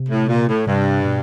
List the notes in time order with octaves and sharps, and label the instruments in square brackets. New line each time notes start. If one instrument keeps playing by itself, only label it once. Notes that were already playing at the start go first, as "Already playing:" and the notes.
Already playing: [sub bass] C3
[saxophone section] A2
A#2
A2
[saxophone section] G2 [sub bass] C3
[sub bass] B2